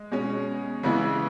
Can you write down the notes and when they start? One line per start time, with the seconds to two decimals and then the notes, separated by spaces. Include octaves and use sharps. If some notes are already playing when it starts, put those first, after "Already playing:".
Already playing: G#3
0.11 B2 G#3 C#4
0.83 C#3 E3 G#3 B3 E4